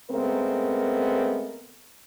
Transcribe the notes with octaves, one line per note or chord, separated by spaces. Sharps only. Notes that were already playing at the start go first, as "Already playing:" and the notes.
C#3 G#3 A3 B3 C4 A#4